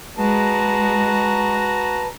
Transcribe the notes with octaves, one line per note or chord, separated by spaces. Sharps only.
G#3 F#4 B4 A5 A#5